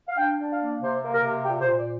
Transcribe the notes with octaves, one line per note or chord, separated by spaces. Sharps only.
F5
D4 G5
D4
F5
A#3
C3 C5
A#3
A#4
C3
A#2 G4
C5
A#2
D5